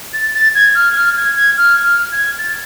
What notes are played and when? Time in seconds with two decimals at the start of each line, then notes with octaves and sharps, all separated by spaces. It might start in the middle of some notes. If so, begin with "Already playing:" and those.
0.14 A6
0.34 A6
0.55 G#6
0.75 F6
0.96 F6
1.16 G#6
1.36 G#6
1.57 F6
1.84 F6
2.12 G#6
2.38 A6